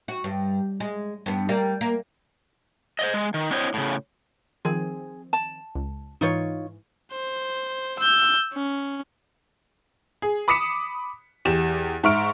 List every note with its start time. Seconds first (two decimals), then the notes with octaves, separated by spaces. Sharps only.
0.08 F#4
0.24 G2
0.80 G#3
1.26 G2 B3
1.49 G3 A#3
1.81 A#3
2.99 C5 D5 D#5
3.14 G#3
3.34 D#3
3.51 C4 D4 E4 C5 C#5 D#5
3.74 A2 C#3
4.65 D#3 F3 C4 G#4
5.33 A5
5.75 C#2
6.21 G#2 E3 D#4 F4 C#5
7.12 C5
7.99 E6 G6
8.53 C#4
10.22 G#4
10.48 B5 D6 D#6 B6 C#7 E7
11.45 E2 G4 E7
12.04 G#2 E5 C#6 F6 D7